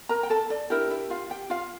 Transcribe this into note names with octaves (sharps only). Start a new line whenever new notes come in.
A#4 A#5
G5
A4 A5
D5
D4 E4 G4 A#4 E5
E4 E5
F4 F5
G4 G5
F4 F5